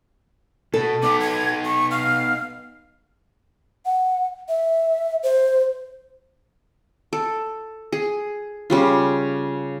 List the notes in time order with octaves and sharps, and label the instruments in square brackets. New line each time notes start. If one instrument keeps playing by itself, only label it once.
[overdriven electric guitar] B2 [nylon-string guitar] A4
[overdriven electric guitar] B3 D#4 [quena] D6
[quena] G#6
C#6
F5
[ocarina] F#5
E5
C5
[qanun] A4
G#4
C#3 G3 F4